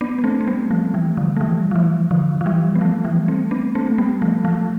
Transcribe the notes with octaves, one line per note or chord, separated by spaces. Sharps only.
B3 D4
B3
A3 C4
C4
G3 B3
F3 A3
E3 G3
D3 F3
A3
E3 G3
F3
E3
D3 F3
F3
E3 G3
B3
F3 A3
E3 G3
A3 C4
B3 D4
A3 C4
A3
G3 B3
F3 A3
F3 A3